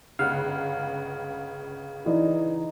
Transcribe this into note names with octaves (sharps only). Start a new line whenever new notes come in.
G1 C#2 C#3 F5 F#5
E3 D#4 D5